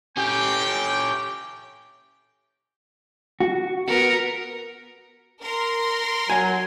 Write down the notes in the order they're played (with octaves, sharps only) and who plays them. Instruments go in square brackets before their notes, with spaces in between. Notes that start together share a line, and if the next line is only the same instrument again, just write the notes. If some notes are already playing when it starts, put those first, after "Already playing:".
[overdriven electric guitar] C#4 G4 [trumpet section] G5
[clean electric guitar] F#4
[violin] B3 C#7 [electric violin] A#4
[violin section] A#4 C6
[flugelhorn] F#3 [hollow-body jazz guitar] G#5